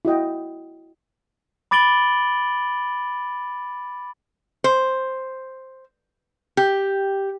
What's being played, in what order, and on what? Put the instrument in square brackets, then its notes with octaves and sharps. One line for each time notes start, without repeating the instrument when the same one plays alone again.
[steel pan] E4 F#4 D#5 G5
[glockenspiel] B5 D6 A6 D7 F#7 G7
[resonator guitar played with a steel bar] C5
G4